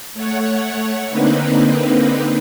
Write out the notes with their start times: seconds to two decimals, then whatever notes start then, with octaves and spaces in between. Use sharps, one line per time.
0.14 A3 C#5 F#5
1.09 D3 A#3 C4 D#4 B4